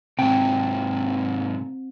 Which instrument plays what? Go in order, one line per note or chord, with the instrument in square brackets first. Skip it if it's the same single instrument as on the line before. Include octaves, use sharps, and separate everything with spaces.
[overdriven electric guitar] G#2 C3 [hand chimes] C4 [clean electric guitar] G5